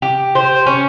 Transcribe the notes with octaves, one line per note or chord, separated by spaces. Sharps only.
G4
C5
C#4